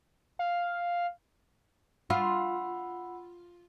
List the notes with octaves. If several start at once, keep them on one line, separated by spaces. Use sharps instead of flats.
F5
F4 F#5 B5 E6